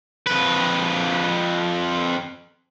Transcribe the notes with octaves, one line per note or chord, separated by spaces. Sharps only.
F2 B4